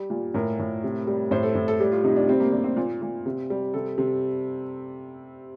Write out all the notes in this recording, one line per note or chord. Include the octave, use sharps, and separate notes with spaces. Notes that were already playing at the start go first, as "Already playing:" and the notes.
Already playing: G3
A#2
A2 A#4
A2
C3
G3
A2 C5
A4
A2
A4
G3 G4
F4
C3 D#4
D4
G3 C4
A#3
C3 D4
C4
A#2
A#2
C3
G3
C3 A4
C3